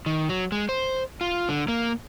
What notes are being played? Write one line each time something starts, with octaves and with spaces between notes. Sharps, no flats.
D#3
F#3
G#3
C5
F4
D3
A#3